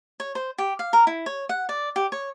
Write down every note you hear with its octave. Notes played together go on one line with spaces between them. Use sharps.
C#5
C5
G4
F5
A#4
E4
C#5
F#5
D5
G4
C#5